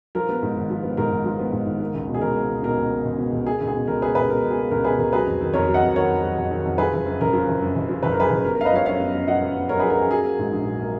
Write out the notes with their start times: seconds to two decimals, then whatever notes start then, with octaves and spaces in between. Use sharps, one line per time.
0.15 F3 A#4
0.29 B3
0.43 G#2
0.56 G#1
0.70 F3
0.83 B3
0.97 G#2 A#4
1.12 G#1
1.25 F3
1.39 B3
1.52 G#2
1.66 G#1
1.80 A#3
1.94 C#2
2.08 B2
2.14 G#4
2.21 C#2 A#4
2.36 A#3
2.50 C#2
2.63 B2 A#4
2.77 C#2
2.91 A#3
3.05 C#2
3.18 B2
3.33 C#2
3.46 A#3 G#4
3.61 C#2
3.67 G#4
3.74 B2
3.88 C#2 A#4
4.02 A#3 G#4 B4
4.15 C#2 G#4 B4
4.29 B2 A#4
4.44 C#2
4.51 G#4
4.58 A#3
4.71 C#2 A#4
4.84 B2 G#4 B4
4.98 C#2 A#4
5.13 F#3 G#4 B4
5.26 F2
5.41 D#3
5.54 F2 A#4 C#5
5.68 F#3
5.74 D#5 F#5
5.82 F2
5.95 D#3 A#4 C#5
6.10 F2
6.23 F#3
6.38 F2
6.51 D#3
6.65 F2
6.78 F3 G#4 B4
6.93 F#1
7.06 F#2
7.21 F#1 A#4
7.33 F3
7.48 F#1
7.62 F#2
7.76 F#1
7.89 F3
8.03 F#1 B4
8.12 A#4
8.18 F#2 G#4 B4
8.30 F#1
8.44 B3 A#4
8.55 A#4
8.59 F#2 F5
8.65 B4 D#5
8.73 F3 C#5 F5
8.86 F#2 C#5 F5
9.00 B3
9.14 F#2
9.27 F3 D#5 F#5
9.42 F#2
9.56 B3
9.69 F#2 A#4 C#5
9.79 G#4 B4
9.83 F3
9.90 A#4
9.98 F#2 G#4
10.11 F#3 G#4
10.25 A#3
10.39 G#2
10.53 A#1
10.66 F#3
10.80 A#3